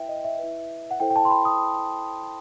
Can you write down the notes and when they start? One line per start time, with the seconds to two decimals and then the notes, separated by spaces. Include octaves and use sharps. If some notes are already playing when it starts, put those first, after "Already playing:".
Already playing: E4 B4 E5 G5
0.09 D#5
0.24 E5
0.39 E4 B4
0.91 F#5
1.00 E4 A4 C5 G5
1.10 G5
1.16 A5
1.25 C6
1.31 B5
1.45 D#6